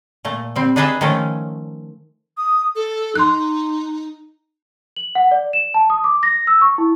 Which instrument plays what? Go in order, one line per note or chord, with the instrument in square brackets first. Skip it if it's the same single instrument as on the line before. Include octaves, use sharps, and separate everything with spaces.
[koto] A#2 A3
G3 C4
D4 D#4 G#4 B4 D#5 E5
D#3 F3 A3 C#4
[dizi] D#6
A4
[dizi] D#4 [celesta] C6 F#6
[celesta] F#7
F#5
D5
E7
A5
D#6
D6
A#6
E6
C#6
E4